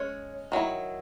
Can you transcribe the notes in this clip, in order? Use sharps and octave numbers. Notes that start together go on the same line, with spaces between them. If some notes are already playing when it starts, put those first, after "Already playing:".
Already playing: G#3 C#4 C#5
D#3 F#3 E4